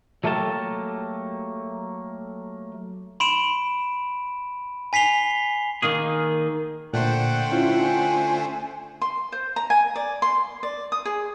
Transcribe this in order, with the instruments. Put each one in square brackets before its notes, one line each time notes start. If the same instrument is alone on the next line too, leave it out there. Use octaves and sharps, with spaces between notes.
[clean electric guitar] F#3 A3 A#3 G4 A5
[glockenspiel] B5 C6 D7 E7
G#5 B6 C7 F7 G7
[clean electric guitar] D#3 A#3 G#4
[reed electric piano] A#2 [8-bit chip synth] D3 A3 C5 [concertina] F#5 G5 F#6
[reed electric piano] C#4 F4 [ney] E4
[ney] G#5
[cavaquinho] C6
C5
A#5
G#5
D5
C6
D5
D#6
G#4